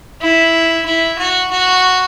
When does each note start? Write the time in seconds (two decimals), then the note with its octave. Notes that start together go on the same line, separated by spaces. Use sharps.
0.21 E4
0.86 E4
1.19 F#4
1.51 F#4